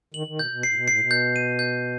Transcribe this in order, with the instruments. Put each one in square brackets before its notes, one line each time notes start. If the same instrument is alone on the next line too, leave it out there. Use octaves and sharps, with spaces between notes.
[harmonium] D#3 [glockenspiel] F#7
[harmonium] D#3
[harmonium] B2 [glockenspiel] G6
[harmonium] B2
[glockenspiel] C7
[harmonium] A2
B2
[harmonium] A2 [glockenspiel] C7
[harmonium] B2
[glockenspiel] G6
D#7
G6